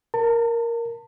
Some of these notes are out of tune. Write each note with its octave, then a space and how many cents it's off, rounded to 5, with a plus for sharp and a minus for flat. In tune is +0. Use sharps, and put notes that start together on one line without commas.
A#4 +0 A5 +35